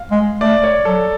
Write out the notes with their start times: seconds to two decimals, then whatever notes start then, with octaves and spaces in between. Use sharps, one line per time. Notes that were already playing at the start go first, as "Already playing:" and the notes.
Already playing: F5
0.11 G#3
0.41 A3 D5
0.64 C#5
0.85 F#3 A4